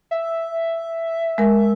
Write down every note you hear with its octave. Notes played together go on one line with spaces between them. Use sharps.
E5
G#3 A#4